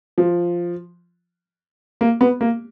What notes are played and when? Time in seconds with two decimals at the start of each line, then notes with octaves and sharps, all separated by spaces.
0.18 F3
2.01 A#3
2.21 B3
2.41 A#3